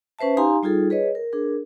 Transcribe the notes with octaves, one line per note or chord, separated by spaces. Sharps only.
C#4 B4 C5 E5 A5
D#4 G4 F5 G#5 A#5 C6
G3 D#4 F4 G#4 A4
G#4 B4 C#5 D#5
A#4
D4 G#4 A#4